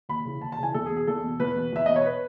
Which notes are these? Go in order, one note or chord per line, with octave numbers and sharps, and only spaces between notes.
D#2 B5
C#3 E3
D#2 A5
A5
C#3 E3 G#5
E2 A4
G#4
B2
G#4
E2 A4
B2
E2 B4
B2
E2 E5
B2 D#5
C#5
B4